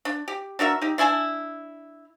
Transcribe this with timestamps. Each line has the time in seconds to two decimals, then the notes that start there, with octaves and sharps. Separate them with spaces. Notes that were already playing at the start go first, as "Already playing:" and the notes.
0.05 D4
0.28 G4
0.59 D4 F#4 A#4 E5
0.81 D#4 G4
0.98 D4 E4 G#5 A5